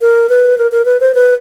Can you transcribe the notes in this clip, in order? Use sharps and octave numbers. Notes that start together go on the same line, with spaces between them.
A#4
B4
A#4
A#4
B4
C5
B4